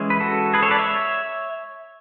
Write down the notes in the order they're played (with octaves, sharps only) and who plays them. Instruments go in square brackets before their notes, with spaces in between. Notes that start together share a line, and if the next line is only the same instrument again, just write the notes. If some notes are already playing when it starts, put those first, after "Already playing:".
Already playing: [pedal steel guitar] E3 G#3 C#4
B4
F#4 A4
G#4 B4
A4 C#5
B4 D5
C#5 E5